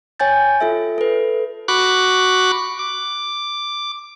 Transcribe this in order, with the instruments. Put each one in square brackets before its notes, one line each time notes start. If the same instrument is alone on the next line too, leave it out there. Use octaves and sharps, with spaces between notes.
[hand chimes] C#5 G5 G#5 G6 A6
F4 A4 E5
A4 B4
[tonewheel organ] F#4 B5 C#6 D6 F#6
D6